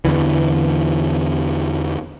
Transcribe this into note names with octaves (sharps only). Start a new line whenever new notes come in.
E2 D3 E3